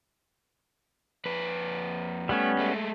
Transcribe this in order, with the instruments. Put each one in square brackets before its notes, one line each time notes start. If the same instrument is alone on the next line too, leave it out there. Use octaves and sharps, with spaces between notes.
[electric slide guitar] F2 B4
[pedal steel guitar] G3 B3 C#4 [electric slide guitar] A3
[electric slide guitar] G#3 A3